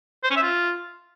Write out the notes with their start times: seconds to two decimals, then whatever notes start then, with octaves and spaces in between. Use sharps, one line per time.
0.24 C5
0.30 C#4
0.37 E5
0.43 F4